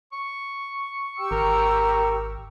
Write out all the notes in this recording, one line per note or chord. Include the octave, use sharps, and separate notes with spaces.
C#6
G4 G5 E6
G#1 A#4